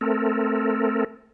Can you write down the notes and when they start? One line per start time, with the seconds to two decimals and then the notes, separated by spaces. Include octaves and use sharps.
0.01 A3 C4 A4 A#4